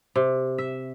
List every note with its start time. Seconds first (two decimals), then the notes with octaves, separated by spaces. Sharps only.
0.16 C3
0.58 E5